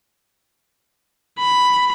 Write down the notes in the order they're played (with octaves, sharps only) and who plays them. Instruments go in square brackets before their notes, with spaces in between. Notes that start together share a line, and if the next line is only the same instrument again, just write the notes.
[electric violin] B5